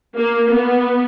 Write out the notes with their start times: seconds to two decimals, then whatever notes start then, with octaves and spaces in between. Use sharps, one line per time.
0.16 A#3
0.51 B3